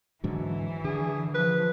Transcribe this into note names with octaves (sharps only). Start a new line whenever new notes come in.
G#2 D3 E3 F#3
D3 G#4
F3 B4